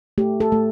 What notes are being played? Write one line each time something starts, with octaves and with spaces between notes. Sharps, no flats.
A3 G4
A4
A3